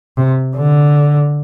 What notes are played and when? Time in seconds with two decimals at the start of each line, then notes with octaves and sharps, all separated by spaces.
0.17 C3
0.57 D3